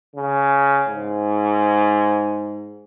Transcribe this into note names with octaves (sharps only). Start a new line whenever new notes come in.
C#3
G#2